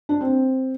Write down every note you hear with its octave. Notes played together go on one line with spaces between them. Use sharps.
D4
C4